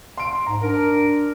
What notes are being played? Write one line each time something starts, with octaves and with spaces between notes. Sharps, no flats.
C6 D7
G#2 A#5
D4 A#4